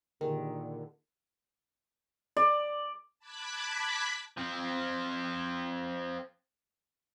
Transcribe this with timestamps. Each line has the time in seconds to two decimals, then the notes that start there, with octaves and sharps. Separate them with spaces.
0.21 A#2 D3 D#3 G4 G#4 A#4
2.37 D5
3.19 A5 B5 D6 F#6 G#6 B6
4.37 F3 C4